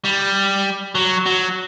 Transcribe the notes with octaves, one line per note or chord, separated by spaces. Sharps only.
G3
F#3
F#3